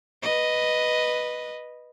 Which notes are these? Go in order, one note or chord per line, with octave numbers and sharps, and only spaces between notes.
B4 D#5